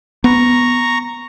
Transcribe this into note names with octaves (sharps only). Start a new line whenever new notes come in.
B3 A#5 C#6